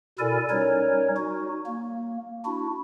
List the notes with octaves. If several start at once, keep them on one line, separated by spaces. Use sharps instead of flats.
B2 E4 A4 A#4 D5 G#5
G3 C#4 D#4 A#4 C#5
D#4 F#4
A#3
D4 E4 F#4